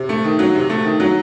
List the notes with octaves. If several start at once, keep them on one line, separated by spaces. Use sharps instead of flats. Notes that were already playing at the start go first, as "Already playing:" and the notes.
Already playing: C3
A3
D#3
F#3
C3
A3
D#3
F#3